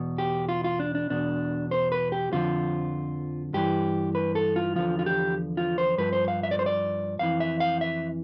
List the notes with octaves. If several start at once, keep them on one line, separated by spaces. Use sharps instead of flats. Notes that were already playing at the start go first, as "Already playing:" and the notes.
Already playing: E2 B2
G4
F4
F4
D4
D4
E2 B2 D4
C5
B4
G4
F2 D3 F3 F4
G2 E3 G4
B4
A4
F4
E2 D3 F3 F4
F4
G4
F4
C5
G2 F3 B4
C5
F5
E5
D5
C5
D5
F2 E3 F5
E5
F5
E5